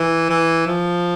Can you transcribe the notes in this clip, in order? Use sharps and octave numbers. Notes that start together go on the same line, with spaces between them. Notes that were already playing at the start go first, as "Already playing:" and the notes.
Already playing: E3
E3
F3